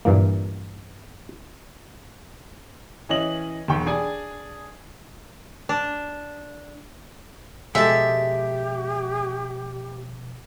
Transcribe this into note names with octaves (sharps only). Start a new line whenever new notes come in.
G2 A#2 E3 A#3
E3 C#4 D#5 F#7
E1 B1 G5 C#6
D4 G#4 D5 G#5
D4
B2 F3 G#3 G4 A4 E5